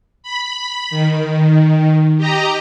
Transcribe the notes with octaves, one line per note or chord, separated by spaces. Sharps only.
B5
D#3
G4 D#5 A#5